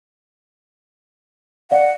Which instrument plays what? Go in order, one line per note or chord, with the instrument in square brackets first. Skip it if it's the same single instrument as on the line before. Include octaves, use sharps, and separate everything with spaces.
[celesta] D5 F5 [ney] F#5